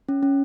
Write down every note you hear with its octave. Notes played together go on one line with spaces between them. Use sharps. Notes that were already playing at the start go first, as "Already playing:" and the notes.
C#4
C#4